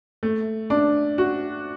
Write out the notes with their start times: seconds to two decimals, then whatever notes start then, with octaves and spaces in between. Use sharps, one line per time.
0.23 A3
0.70 D4
1.18 F#4